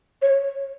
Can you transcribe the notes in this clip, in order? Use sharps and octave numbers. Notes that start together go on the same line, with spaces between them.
C#5